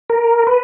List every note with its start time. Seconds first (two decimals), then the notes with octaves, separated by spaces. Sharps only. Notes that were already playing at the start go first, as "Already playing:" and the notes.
0.10 A#4
0.47 B4